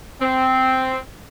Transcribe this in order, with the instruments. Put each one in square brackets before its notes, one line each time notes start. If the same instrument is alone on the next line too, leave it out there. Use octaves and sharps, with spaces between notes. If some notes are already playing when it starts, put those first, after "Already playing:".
[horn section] C4